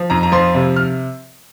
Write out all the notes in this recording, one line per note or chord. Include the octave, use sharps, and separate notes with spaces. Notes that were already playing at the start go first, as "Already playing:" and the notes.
Already playing: F3
F2 A#5
A#5
F3 C6
C3
F6